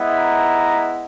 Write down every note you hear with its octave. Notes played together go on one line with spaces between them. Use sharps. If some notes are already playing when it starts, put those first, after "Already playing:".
Already playing: G#3 B3 E4
A#5